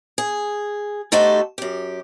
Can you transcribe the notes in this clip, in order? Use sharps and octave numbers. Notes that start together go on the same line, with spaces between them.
G#4
A3 D#4 F#4 G4 A4 C5
F#2 G4